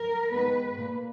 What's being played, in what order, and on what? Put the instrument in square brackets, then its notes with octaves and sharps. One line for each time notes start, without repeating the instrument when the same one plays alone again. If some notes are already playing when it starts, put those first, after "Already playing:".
Already playing: [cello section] A#4
D#3 G#3 B3 B4
A#2 A#3